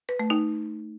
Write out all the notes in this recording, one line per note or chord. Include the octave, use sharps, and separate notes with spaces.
B4
A3
D#4